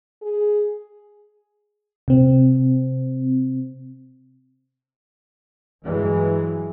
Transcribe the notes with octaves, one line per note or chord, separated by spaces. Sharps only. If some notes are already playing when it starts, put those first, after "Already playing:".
G#4
C3 C4
G2 E3 F#3 G#3